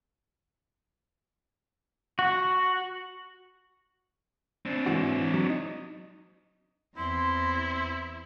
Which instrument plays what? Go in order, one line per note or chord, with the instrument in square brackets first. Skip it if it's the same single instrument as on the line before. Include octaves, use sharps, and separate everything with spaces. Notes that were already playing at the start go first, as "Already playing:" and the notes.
[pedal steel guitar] F#4
[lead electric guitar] C4 D4
[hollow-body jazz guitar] G#2 E3 F#4
F#3
D#4
[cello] E2 C4 [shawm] E4 [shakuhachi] C6